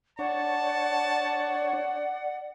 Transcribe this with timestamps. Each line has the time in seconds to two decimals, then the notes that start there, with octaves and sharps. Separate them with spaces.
0.19 D4 C#5 D5 F#5 A5